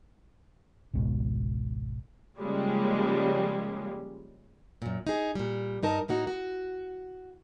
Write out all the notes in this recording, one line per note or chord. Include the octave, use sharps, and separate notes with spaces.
G#1 C#2 G#2 B2
C#3 F3 G3 G#3 A#3
F#2 A#2
D#4 G#4
A#2 G3
G2 D#4 A#4 A5
A2 A#3 D#4 F#4
F#4